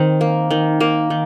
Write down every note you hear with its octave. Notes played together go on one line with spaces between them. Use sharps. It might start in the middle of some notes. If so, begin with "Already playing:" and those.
Already playing: D#3 C4 D#4
A#3
D#3
A#3
D#3